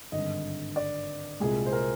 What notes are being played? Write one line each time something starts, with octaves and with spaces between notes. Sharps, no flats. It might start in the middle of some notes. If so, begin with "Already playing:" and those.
G#1 G2 D3 D#5
D5
C2 A#2 G#3 G#4
C5
A#4